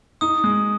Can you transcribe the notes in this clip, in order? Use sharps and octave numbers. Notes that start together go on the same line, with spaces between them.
D#4 D#6
G#3